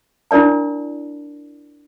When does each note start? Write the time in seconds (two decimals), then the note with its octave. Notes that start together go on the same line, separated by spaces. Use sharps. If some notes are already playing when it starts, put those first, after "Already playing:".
0.31 D4 E4 A#4 D5 A5